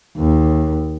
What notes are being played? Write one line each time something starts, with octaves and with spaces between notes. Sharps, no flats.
D#2